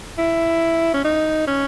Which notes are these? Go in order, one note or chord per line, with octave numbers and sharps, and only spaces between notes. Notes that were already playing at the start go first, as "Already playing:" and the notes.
E4
C#4
D#4
C#4